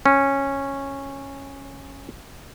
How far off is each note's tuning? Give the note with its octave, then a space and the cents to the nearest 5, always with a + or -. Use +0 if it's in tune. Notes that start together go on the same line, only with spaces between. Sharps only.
C#4 -10